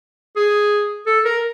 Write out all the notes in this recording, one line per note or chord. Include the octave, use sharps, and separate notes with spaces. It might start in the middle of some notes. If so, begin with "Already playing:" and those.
G#4
A4
A#4